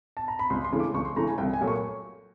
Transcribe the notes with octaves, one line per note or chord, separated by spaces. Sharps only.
A5
A#5
B5
C#2 C6
C6
C#3 E3 A3
D6
C#2 C#6
C6
C#3 E3 A3 A#5
G#5
C2 G5
G#5
A#2 F#3 A3
C#6